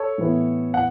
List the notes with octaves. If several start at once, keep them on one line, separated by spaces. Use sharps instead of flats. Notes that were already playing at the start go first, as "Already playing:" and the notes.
Already playing: A4 C#5
A2 E3 B3 E4
F#5